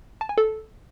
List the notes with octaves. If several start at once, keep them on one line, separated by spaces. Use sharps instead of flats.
A5
G#5
A4